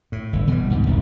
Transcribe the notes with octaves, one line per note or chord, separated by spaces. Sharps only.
A2
G1
B2 E3 F#3 G3
D2 G#2 B2 D3
E1 C2 G#2